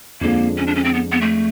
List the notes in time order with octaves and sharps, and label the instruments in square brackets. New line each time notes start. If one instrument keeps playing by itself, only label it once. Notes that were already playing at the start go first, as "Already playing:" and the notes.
[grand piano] F2 D3 F3 G#3 [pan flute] A#3
[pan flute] C#4
D4
C#4
C4
B3
B3
A3